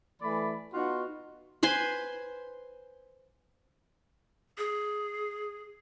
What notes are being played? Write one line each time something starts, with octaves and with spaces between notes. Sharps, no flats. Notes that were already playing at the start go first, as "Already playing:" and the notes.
E3 A3 D5 B5
B3 D#4 F4 F#4
B4 C5 G#5 C6
G#4